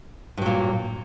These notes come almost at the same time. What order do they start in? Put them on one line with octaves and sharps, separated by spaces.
G2 F#3 A#2